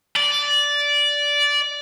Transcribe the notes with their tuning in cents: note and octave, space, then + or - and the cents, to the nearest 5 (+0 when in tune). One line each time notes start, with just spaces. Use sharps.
D5 -15